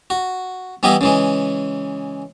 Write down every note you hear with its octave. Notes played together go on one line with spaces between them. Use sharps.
F#4
E3 G3 B3 E4 D#5
C#3 E3 G#3